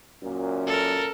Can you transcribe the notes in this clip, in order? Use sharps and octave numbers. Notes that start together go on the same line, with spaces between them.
F#2 A#2
A4 A#4